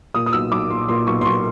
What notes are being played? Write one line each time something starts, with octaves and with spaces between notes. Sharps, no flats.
A#2 D#6
D#6
B1 E6
B1 D6
A#2 C6
A#2 C6
B1 C#6
C6
B1 C#6